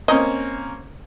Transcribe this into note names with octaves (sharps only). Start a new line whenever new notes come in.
A#3 C4 C#4 D#5